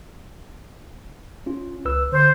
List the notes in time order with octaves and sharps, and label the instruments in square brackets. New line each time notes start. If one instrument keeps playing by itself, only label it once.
[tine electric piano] C#4 F4
C#2 B4 E6
[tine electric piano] D3 C6 [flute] C5